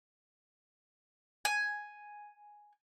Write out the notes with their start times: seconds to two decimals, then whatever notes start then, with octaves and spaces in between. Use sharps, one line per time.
1.45 G#5